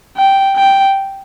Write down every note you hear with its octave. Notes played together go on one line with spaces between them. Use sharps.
G5
G5